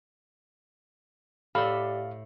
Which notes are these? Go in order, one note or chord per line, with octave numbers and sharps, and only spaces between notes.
A2 G4 D5 F5 B5 E6